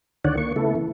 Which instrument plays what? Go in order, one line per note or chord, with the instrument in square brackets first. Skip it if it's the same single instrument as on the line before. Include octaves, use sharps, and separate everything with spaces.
[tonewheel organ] D2 D3 D#3 C#5 D5 F#5
A#3 C#6
C#3 A3 B3 E4 A4
E3